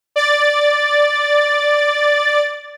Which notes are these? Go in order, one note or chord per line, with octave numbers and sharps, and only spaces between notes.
D5 A6